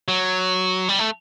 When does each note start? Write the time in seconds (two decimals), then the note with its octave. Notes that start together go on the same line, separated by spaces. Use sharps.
0.08 F#3
0.89 G3
0.99 A3